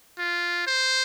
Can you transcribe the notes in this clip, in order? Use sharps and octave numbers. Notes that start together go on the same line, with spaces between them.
F4
C5